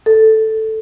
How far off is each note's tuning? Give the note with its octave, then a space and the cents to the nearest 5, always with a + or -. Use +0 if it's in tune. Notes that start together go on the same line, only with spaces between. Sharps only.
A4 +0